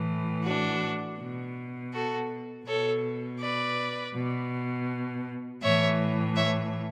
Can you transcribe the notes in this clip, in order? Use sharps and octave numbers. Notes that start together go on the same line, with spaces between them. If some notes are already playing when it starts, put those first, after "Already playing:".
Already playing: A2 E3
D4 F#4
B2
F#4 A4
B2 A4 C#5
B4 D5
B2
A2 E3 C#5 E5
C#5 E5